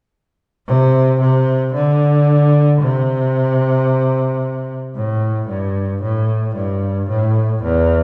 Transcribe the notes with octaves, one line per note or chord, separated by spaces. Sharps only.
C3
C3
D3
C3
A2
G2
A2
G2
A2
E2